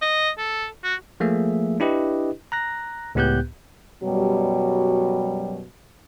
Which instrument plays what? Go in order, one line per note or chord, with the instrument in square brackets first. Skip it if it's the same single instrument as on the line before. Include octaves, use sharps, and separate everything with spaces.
[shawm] D#5
A4
F#4
[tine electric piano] F3 A3 A#3 G#4 E5
D4 E4 G4 B4 D#5
A#5 F#6 A#6
C#2 A2 B3 G4 F#6 G6
[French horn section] F#2 B2 F#3 G3